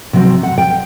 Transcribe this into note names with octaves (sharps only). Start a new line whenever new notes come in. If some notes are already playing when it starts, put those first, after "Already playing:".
C3 F#3 C4
F#5
G5